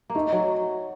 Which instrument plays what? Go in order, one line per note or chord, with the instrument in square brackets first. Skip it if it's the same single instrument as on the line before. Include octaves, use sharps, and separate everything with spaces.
[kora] A#3
[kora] A3 [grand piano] D#4
[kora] F#3